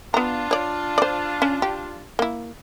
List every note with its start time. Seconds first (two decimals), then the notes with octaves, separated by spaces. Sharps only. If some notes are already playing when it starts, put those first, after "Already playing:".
0.14 B3 D4 F4 A#5
0.51 C#5 D5
0.98 C5 D5
1.42 C#4
1.62 G4
2.19 A#3 E4